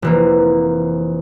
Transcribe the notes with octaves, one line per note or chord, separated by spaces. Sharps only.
F1 E3 A#3